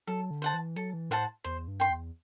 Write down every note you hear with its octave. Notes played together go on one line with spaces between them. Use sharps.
F#3 A4
D3
C5 F#5 A5
E3
F#3 A4
E3
A2 C5 F#5 A5
E2 C5
G2
G5 C6
E2